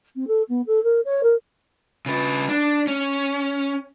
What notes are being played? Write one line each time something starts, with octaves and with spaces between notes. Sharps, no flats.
C4
A4
B3
A4
A#4
C#5
A#4
C#3 B4
D4
C#4